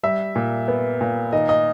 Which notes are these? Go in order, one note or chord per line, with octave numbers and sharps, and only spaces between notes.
G3 E5
A#2
B3
A#2
D#3 D#5
D#5